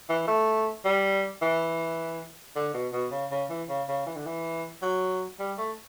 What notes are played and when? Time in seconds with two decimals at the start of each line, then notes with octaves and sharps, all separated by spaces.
0.09 E3
0.28 A3
0.85 G3
1.42 E3
2.56 D3
2.74 B2
2.93 B2
3.11 C#3
3.31 C#3
3.50 E3
3.69 C#3
3.88 C#3
4.06 E3
4.16 D3
4.26 E3
4.82 F#3
5.40 G3
5.58 A3